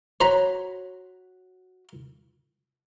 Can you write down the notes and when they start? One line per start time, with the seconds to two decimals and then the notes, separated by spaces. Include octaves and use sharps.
0.21 F#4 C5 C#5 A#5 B5